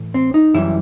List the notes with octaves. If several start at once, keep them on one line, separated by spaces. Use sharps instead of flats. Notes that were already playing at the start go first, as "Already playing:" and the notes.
Already playing: A2 E3
C4
D#4
F#2 E3 G3 E4